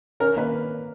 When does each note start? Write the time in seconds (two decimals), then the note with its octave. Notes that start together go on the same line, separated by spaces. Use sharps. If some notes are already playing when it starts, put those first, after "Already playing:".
0.20 C#4 A#4
0.36 A#3 B4